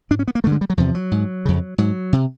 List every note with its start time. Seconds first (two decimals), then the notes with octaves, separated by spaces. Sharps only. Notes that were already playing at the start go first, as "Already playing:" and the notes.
0.10 G#2 D4
0.19 C#4
0.28 B3
0.35 A#3
0.44 G2 D3 A3
0.52 G#3
0.61 G3
0.70 F#3
0.77 E2 C3 F3
0.95 F#3
1.11 G#2
1.45 F2 C#3
1.78 G#2 F#3
2.13 C3